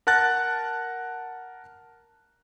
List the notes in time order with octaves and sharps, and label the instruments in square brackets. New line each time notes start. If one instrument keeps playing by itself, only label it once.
[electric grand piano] A#4 F#5 A5 F#6 A6 A#6